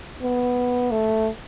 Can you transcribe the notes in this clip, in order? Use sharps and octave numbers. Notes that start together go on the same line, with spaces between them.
B3
A3